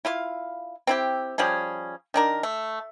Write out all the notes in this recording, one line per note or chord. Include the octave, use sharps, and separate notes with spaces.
E4 F4 F5
C4 E4 G4
F3 G3 C#4 G#4
D#3 D4 A#4
A3